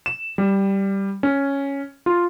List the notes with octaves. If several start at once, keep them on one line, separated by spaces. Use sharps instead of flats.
E7
G3
C#4
F4